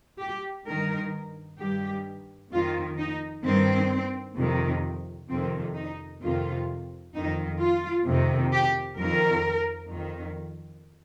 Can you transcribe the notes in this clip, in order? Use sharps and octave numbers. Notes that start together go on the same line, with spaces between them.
G4
G2 D#3 A#4
G2 D#3 G4
F2 D#3 F4
D#4
G2 D#3 C4
F2 C3 D#3
F2 C3 D#3 C4
D#4
F2 C3 D#3 F4
F2 D#3 D#4
F4
F2 C3 D#3
G4
F2 D#3 A#4
F2 D#3